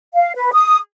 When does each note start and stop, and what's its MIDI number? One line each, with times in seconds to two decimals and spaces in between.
0.14 0.32 77
0.35 0.50 71
0.53 0.77 87